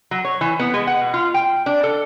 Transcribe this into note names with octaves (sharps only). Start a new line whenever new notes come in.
F#3
C#5
E3
B3
G#3
F#5
B2
F4
G5
D4
A4